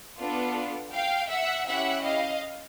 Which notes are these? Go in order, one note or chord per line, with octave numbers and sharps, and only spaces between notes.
B3 D4 F4 A4
F5 G5
E5 F#5
C#4 E4 G4 E5 F#5
D#5 F5